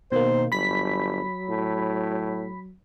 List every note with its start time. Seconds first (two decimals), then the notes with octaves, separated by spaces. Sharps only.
0.12 B2 D#3 A#3 C5
0.52 G1 F#3 B5 B6
1.50 A2